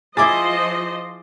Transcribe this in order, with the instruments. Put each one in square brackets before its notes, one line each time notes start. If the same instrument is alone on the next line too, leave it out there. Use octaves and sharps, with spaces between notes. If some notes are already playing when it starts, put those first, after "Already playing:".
[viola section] F3 C5 D#5 [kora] E4 G#4 [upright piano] D6 A6